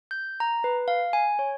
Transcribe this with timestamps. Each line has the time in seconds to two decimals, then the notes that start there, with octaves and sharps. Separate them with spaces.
0.11 G6
0.40 A#5
0.64 B4
0.88 F5
1.13 G#5
1.39 C#5